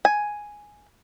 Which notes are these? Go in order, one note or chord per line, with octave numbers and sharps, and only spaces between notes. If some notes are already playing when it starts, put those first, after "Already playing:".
G#5